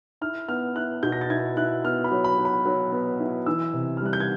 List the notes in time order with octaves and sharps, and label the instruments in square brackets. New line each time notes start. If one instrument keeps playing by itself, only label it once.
[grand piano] E4 F6
B3 F6
E4 F#6
B2 G6
A#6
A6
E4 G#6
E4 F#6
B3 F6
B5
F#3
B5
F#3
B5
F#3
B3
E4
E3 E6
C3
F6
G3 F#6
G6
G#6